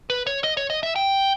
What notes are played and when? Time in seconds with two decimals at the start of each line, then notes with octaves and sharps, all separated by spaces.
0.10 B4
0.27 C#5
0.44 D#5
0.57 C#5
0.70 D#5
0.83 E5
0.96 G5